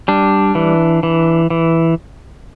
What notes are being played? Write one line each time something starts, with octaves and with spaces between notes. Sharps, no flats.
G3 D4
E3
E3
E3